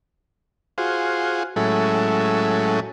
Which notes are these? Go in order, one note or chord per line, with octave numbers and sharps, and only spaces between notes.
F4 F#4 G#4 C5
A2 F#3 G#3 C#4 E4 A4